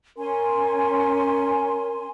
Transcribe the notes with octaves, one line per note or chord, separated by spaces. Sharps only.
C#4 A#4 G#5 C6